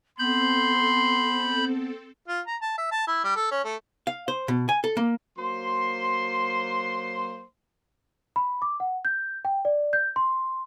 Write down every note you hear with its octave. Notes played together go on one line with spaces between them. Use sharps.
B3 C4 A4 B5 C6 G6
F4
A#5
A5
E5
A5
E4
G3
A4
C#4
A3
F5
C5
B2
G#5
A4
A#3
F#3 A#3 C5 C6
B5
D6
F#5
G6
G5
D5
G6
C6